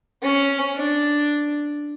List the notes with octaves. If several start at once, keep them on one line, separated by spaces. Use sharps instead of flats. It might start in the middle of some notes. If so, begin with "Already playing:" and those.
C#4
D4